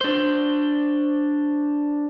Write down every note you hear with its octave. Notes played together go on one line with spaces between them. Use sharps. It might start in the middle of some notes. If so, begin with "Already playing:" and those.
D4 C5